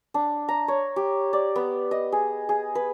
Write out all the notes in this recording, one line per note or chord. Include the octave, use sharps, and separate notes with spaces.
D4
A#5
C#5
G4
D5
B3
D#5
G#4
G#4
B4